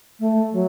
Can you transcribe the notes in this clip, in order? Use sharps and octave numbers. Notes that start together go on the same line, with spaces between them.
A3
F#3